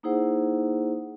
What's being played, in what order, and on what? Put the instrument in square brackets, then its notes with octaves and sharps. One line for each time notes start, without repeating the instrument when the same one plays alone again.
[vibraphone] A#3 D#4 E4 G#4 C5 F#5